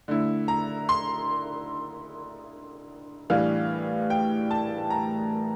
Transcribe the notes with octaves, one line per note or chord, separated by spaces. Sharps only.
D3 A3 E4
A#5
C6
A2 E3 G3 D4 F5
G5
A5
A#5